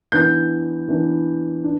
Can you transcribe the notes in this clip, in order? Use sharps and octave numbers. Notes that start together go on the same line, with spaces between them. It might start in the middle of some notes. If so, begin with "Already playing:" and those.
E3 B3 D4 G6
E3 B3 D4
D4